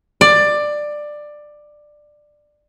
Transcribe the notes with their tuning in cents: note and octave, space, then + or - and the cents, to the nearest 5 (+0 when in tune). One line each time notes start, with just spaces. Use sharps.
D5 +15